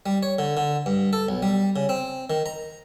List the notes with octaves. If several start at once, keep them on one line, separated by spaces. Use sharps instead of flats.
G3
C#5
D3
D3
G2
A4
B1
G3
C#3
C4
D#3
A#5